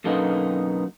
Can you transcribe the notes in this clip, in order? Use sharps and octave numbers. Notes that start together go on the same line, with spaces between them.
F#2 B2 D3 A#3 B3 D#4